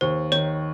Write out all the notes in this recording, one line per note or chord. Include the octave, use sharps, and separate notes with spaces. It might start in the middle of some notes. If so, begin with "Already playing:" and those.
D#2 C5
D#3 C#5